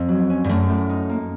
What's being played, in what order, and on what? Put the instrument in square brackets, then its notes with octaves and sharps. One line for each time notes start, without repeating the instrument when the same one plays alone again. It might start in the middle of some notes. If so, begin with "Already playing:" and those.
Already playing: [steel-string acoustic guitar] F2 [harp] C#4
[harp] F#3
C#4
[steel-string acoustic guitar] G2
[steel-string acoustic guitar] F#2 [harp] A3
[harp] A2
D#4
A#3